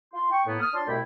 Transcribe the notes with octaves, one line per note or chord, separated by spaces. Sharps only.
F4 C6
G5 C#6
A2 A#3 B3
D#6 F6
D4 F4 C#5 A5 C6
C2 B2 A3 E4 G5 B5